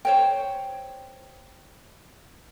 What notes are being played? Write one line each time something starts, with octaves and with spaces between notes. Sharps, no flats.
C5 C#5 G5